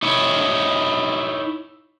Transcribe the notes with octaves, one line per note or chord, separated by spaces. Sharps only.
D#4 E4 C#5